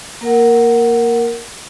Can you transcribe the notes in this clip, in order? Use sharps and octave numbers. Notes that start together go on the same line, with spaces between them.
A#3 A#4 F#5